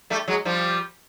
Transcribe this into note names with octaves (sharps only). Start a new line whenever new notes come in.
G3 A3
F#3 G#3
F3 G3